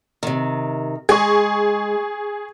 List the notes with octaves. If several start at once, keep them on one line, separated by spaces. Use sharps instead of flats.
C3 D#3
G#3 G#4 C#6